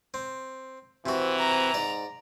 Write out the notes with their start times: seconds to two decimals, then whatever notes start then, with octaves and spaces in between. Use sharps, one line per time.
0.14 C4
1.06 C3 E3 C4 F#4
1.39 A#5
1.74 G#2 D5